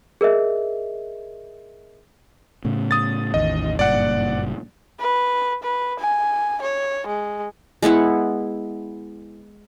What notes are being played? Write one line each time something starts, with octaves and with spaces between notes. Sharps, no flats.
G#4 A#4 D#5 E5
A2 C#3
D#6 A6
A1 E2 D#3 D#5
F#1 G2 A#2 D5 F#5
B4
B4
G#5
C#5
G#3
G#3 B3 E4 F#5